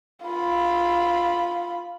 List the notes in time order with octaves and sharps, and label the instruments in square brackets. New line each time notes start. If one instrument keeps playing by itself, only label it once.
[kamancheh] F4 B5